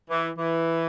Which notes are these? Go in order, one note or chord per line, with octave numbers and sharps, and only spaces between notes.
E3
E3